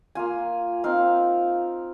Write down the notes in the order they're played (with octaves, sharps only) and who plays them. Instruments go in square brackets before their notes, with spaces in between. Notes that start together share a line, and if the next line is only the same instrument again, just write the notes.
[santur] A#3 F4 G#5
C4 D#4 F5